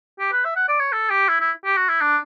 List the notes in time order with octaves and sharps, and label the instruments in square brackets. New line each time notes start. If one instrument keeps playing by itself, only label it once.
[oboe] G4
B4
E5
F#5
D5
C#5
A4
G4
E4
E4
G4
F#4
E4
D4